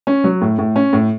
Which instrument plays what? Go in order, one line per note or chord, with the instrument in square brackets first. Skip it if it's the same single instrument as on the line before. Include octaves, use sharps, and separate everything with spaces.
[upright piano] C#4
F#3
A2
A2
C#4
A2